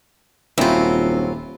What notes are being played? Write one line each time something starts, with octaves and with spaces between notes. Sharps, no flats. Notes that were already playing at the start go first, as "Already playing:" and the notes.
D#1 F#2 F#3 C4 E4 F4